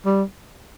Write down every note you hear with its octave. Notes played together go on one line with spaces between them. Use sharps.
G3